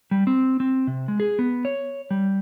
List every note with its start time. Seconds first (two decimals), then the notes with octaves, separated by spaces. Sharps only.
0.11 G3
0.27 C4
0.60 C4
0.87 C3
1.08 G#3
1.20 G#4
1.39 B3
1.65 C#5
2.11 G3